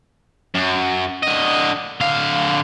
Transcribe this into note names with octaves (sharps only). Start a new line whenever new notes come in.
F#2
D3 D#5
D3 F5